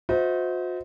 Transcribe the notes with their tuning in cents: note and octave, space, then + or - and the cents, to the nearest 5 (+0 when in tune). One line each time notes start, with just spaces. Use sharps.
F#4 -45 C5 -20 D#5 +40